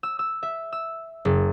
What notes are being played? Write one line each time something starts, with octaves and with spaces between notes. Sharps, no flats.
E6
E6
E5
E6
F#1